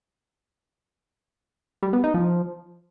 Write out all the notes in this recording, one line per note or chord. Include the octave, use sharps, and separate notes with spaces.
G3
B3
D#4
F3